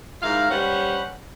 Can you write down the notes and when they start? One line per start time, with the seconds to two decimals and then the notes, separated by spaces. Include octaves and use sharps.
0.22 G#2 E4 A#4 F5
0.50 G3 C#4 B4 C5 F#5